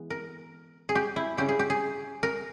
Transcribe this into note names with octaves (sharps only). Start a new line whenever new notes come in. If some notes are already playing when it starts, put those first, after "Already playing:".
Already playing: E3 G#3 B3
A#4
G#4
G4
E4
C#3 G3 C#4 E4 G4
G#4
G4
G#4
A#4